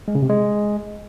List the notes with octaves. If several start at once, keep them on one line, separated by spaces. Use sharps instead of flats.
G#3
C#3
C3
G#3